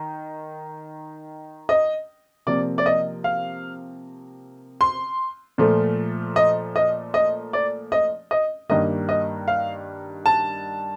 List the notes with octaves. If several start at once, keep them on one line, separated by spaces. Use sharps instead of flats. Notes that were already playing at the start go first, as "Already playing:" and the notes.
Already playing: D#3
D#5
C3 F3 A#3 D5
D5
D#5
F5
C6
A#2 F3 A3
D#5
D#5
D#5
D5
D#5
D#5
G2 D#3 A#3 D#5
D#5
F5
A5